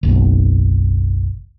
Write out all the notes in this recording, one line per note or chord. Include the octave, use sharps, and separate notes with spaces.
F#1 B1